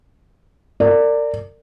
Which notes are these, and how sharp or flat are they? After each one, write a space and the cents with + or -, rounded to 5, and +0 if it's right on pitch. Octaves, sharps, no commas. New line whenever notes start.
A#4 -35 D5 +0